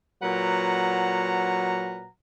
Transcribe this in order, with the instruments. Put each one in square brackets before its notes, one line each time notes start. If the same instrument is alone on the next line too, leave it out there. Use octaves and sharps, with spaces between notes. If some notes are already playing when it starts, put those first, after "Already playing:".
[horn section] A#2 F#3 B4 F#5 A#5